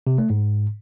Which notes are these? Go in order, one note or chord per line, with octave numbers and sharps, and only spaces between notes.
C3
A3
G#2